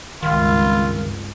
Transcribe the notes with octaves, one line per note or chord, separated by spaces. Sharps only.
G#1 C#2 G2 D#3 F4